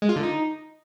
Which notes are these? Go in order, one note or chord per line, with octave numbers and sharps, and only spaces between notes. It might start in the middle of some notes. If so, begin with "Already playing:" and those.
G#3
F4
D3
D#4